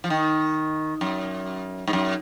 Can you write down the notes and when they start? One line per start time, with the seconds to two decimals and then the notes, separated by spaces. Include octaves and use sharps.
0.04 F3
0.10 D#3
1.01 F#2
1.87 G#2
1.93 F#2